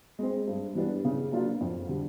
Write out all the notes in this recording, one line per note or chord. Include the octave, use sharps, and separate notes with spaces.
G#3 C4
G2
E3 G3 B3 D4
C#3
F#3 A#3 D4 F4
F2
D3 G3